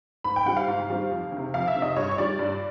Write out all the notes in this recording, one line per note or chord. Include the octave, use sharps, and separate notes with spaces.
G#2 B5
G5
D#3 G3 C4 F#5
F5
G#2
D#3 G3 C4
F2
C3 D#3
F2 F5
E5
C3 D#3
D#5
G2 C#5
C#5
D#3 G3 D5
G2